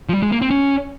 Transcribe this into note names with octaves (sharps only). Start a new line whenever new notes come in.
F3
G3
G#3
A#3
C4
C#4